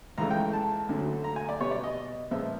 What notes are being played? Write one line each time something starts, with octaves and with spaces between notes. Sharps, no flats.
C#2 C#3 E3 A3 A#5
G5
A5
D2 D3 F#3 A3
A#5
G#5
D5
B2 G3 B3 C#5
D5
D#5
A#2 F3 G#3 B3 E5